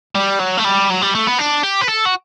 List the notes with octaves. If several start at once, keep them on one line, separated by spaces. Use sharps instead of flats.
G3
F#3
A3
G3
F#3
G3
A3
B3
D4
G4
B4
A4
F#4